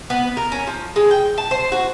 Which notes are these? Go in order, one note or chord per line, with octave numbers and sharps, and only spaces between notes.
B3
A#4
C#4
F3
G#3
G5
A5
C5
F#4